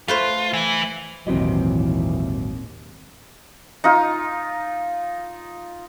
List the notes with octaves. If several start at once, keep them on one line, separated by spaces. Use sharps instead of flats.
A3 F4 B4 C5
E3 E4
G#1 D#2 A#2 E3 F#3 C4 G4 D#5
D#4 F4